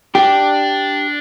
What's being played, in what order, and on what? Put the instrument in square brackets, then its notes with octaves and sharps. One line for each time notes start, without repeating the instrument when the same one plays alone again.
[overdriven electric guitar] D4 [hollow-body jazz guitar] G4